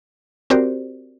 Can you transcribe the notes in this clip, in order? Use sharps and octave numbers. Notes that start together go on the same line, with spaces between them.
C4 F#4 G4 A#4 C5 D5